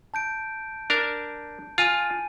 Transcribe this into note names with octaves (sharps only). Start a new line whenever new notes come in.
A5 G6 D7
D4 A#4
F4 G#5 D#7